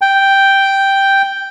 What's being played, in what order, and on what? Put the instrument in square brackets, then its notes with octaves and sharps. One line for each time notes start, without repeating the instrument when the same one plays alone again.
[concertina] G5